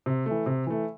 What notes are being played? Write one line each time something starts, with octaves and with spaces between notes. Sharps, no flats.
C3
A3
E3
C3
E3 A3